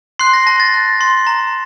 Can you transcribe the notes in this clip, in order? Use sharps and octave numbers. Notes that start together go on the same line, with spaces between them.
C6 F#6 C7
A#6
A5 A#6
A6
F#6
C6
A#5